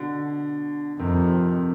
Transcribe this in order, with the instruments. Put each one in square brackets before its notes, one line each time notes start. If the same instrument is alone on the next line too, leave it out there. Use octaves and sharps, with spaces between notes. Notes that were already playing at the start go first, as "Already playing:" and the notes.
Already playing: [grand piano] B2 D3
[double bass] F2 [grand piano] C3 D#3